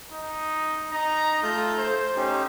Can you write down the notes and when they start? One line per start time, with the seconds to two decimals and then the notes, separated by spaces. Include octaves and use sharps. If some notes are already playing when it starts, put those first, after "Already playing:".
0.11 D#4
0.92 D#4 D#5 A#5
1.43 A3 F4 A4 G6
1.78 C5
2.16 C#4 D#4 G4